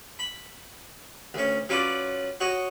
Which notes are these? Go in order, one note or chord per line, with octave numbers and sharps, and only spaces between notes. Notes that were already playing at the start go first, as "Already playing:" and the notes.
B5
D2 C#4
F#3 C#4 F4 B4 D5
F#4 C#5 D#5